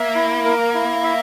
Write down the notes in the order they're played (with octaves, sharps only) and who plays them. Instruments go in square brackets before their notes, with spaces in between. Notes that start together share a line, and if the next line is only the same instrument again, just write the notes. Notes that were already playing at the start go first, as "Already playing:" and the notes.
Already playing: [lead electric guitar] A#3 [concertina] E5
[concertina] E4
A#4
E4
E5